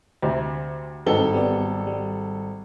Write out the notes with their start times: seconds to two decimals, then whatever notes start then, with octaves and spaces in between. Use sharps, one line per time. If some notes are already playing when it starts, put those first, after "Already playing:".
0.22 D2 C3
1.06 G#1 G2 C4 D#4 A4 G7
1.33 G3 B3 D5
1.87 G3